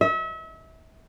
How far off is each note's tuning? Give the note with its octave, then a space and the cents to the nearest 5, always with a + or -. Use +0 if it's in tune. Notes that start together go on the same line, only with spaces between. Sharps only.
E5 -35